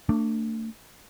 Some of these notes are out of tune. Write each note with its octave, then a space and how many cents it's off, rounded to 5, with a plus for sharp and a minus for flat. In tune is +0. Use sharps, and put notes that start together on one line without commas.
A3 +35 D4 +0